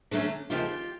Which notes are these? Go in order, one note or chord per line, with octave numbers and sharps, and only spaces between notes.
D3 F#3 A3 C#4
D#2 C#3 F3 F4 G4